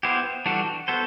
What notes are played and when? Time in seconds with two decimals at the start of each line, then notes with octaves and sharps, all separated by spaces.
0.03 B3 E4 G4 C5
0.46 E3 G3 D4 F#4 A4
0.88 B3 F#4 A4 C5